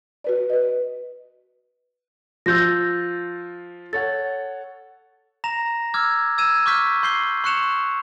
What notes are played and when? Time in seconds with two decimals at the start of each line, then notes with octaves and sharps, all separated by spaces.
0.24 F#4 B4 D5
0.50 B4 D#5
2.46 F3 F4 E6 G6 A#6
3.93 A4 C#5 F#5 A6
5.44 A#5 A#6 E7 F7
5.94 D6 E6 F6 G#6
6.38 E6 G#6 D#7 E7
6.66 C#6 D6 F6 G6 B6
7.03 C6 G6 C7 G7
7.44 C6 C#6 F#6 C#7 E7 F7